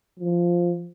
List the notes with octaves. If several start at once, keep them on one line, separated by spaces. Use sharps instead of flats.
F3